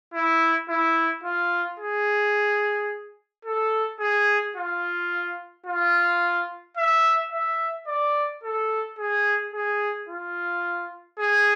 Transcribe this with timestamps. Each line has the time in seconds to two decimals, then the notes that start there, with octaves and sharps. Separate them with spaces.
0.14 E4
0.69 E4
1.24 F4
1.80 G#4
3.45 A4
4.00 G#4
4.56 F4
5.66 F4
6.77 E5
7.32 E5
7.87 D5
8.43 A4
8.98 G#4
9.54 G#4
10.09 F4
11.19 G#4